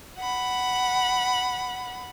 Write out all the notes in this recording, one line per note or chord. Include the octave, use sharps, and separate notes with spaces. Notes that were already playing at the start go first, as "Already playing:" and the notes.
F#5 B5